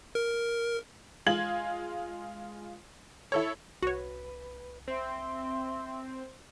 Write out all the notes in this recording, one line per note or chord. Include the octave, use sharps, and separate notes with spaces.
A#4
G#3 F4 G#6 F#7
E4 A4 C#5
C2 F#4 B4 C#5
C4 E5 C6